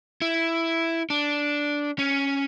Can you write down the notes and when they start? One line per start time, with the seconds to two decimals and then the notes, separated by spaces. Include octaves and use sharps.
0.22 E4
1.10 D4
1.99 C#4